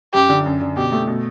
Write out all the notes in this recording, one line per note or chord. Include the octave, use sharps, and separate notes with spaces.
F#2 G4
D3
F#2
D3
B2 G4
A3
B2